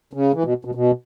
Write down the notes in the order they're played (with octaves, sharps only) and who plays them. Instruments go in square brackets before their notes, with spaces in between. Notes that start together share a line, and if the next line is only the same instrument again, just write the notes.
[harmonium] C#3
E3
B2
B2
B2